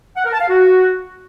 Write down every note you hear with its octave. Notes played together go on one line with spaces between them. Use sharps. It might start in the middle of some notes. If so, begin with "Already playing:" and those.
F#5
A#4
A5
F5
F#4